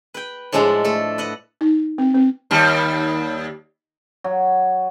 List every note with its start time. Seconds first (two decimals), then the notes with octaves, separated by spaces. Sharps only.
0.14 B4 G5
0.52 A2 F3 G#3 D4 A4 A#5
0.85 A3 A4
1.18 B4 D#5 F#5
1.61 D#4
1.98 C4
2.15 C4
2.51 D#2 G3
4.24 F#3